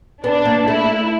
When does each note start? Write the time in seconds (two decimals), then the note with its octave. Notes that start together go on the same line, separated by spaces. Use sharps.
0.23 B3 D4
0.45 A#3
0.68 A3 E4